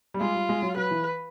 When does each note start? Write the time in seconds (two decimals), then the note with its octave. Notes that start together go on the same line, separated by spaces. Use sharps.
0.14 G3
0.20 G#3 F4
0.35 G3
0.49 G#3
0.62 F#3
0.77 F#3 B4
0.91 E3